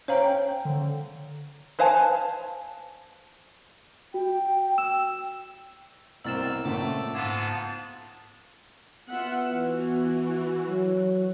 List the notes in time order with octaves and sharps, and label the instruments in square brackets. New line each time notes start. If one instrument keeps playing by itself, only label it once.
[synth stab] C#4 G5 [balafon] C5 F5 A#5
[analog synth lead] D3
[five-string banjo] B4 C5 F5 G#5 A5
[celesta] F#4 [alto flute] G5
[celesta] E6 E7
[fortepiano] C2 B2 F6 [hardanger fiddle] A#3 C4 [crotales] E6 A6 E7
[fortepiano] C#2 F#2 A#2 [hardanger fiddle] A3 [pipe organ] D6
[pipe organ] G#2 B3 A5 [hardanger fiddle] F4 [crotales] G#6
[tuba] B3 [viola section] F4 E5 F#5
[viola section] E3 F#4
[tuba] F#3